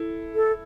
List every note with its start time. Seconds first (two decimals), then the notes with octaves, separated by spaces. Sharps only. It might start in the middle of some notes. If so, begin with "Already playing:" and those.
Already playing: E4 A4
0.35 A4